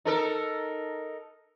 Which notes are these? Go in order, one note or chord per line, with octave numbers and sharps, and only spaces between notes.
D#4 A4 A#4